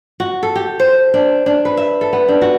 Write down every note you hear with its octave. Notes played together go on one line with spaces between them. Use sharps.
F#4
A4
G4
C5
D4
D4
B4
E5
A4
B3
D4
F#4